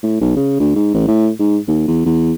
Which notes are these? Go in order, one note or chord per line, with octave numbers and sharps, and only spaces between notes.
A2
B1
C#3
D2
G#2
A1
A2
G#2
D#2
E2
E2